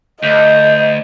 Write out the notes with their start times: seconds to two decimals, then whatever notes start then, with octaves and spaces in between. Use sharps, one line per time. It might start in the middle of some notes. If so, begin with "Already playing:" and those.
0.23 D2 D#5 G6